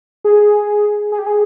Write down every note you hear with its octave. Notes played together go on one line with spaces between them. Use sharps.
G#4
G#4
G4
G#4